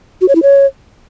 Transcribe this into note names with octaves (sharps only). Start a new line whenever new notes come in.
F#4
C#5
E4
C#5